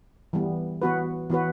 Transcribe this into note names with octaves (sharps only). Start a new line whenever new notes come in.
E3 G3 B3
E3 B3 F#4 B4
E3 B3 F#4 B4